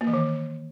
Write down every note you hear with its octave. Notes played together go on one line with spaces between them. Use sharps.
A#3
E3
D#3